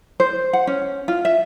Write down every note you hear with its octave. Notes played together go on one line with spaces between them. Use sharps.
C5
F#5
C#4
F4
E5